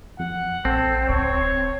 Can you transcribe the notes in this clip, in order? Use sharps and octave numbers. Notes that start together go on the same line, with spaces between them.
F2 F#5
A#1 C4 A4
D1 C#5